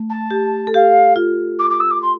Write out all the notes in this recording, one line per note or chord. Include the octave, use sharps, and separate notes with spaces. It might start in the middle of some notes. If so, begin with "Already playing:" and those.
Already playing: A3
A5
G4
A4
G4 F5
F4
D6
D6
E6
D6
C6